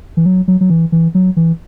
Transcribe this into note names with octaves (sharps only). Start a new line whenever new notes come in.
E3
F#3
F#3
F#3
E3
E3
F#3
E3